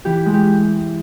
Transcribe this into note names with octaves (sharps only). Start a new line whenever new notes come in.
E3 G4
G#3
G4